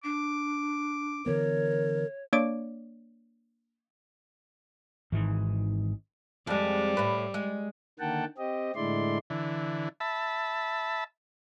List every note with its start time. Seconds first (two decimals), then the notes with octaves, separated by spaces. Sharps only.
0.04 D4 D6
1.26 D3 E3 B3 A#4 C#5
2.33 A#3 D4 C#5 D5 D6 D7
5.12 G#1 G#2 D#3 E3
6.47 F2 G3 G#3
6.97 A2 B4
7.34 G#3
8.00 D3 D#3 A#3 F#5 G5 A5
8.38 C4 G4 D#5
8.75 A2 D3 G#3 E4 D5 C6
9.30 D3 E3
10.00 E5 A5 B5